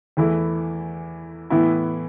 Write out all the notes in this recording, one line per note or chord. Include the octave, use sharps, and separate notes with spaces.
E2 E3 A3 E4
A2 E3 B3 E4